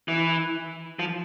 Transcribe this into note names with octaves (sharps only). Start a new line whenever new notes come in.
E3
F3